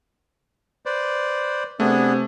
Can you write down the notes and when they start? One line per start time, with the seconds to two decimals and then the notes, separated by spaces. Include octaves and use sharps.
0.86 B4 C5 D5
1.80 C3 A3 B3 D4 G#4